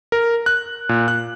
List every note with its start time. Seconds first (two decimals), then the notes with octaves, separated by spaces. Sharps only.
0.12 A#4
0.46 F#6
0.89 A#2
1.08 F#6